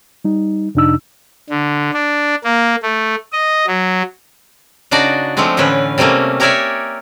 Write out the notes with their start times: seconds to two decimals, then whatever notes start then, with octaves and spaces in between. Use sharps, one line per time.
0.25 G3 D#4
0.75 F2 C3 D4 D#4 E6
1.50 D3
1.93 D4
2.44 A#3
2.83 A3
3.33 D#5
3.67 F#3
4.91 C#3 D4 D#4 F#4 D5
5.37 F3 G#3 A3 C4 D4
5.57 A2 D3 E3 C#4 B4
5.98 C3 G3 A3 A#3 C#4
6.40 G4 A#4 C#5 D5 E5 G#5